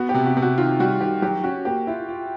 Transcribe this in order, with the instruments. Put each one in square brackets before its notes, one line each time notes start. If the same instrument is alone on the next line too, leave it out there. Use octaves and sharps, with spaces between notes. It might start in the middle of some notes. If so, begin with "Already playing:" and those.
Already playing: [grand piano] B3 [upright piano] F#4
[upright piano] G4
[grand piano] C3
[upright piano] F#4
[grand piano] C3
[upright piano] F#4
[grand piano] D#3 [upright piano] F4
[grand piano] G3 [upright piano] F#4
[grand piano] D#3 [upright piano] G4
[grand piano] F#3 [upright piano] G4
[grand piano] C#4 [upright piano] F#4
[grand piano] A#3 [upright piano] G4
[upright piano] E4 [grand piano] F4
[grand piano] F4